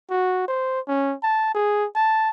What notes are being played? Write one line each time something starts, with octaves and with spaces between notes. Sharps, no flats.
F#4
C5
C#4
A5
G#4
A5